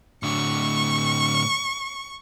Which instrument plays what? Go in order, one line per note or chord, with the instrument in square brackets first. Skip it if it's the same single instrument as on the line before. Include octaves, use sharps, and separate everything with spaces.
[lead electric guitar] A2 D3 [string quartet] C#6